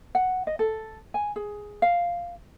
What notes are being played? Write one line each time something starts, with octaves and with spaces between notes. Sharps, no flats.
F#5
D#5
A4
G#5
G#4
F5